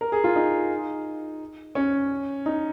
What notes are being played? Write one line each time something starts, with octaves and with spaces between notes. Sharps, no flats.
A#4
G#4
F4
D#4
C#4
D#4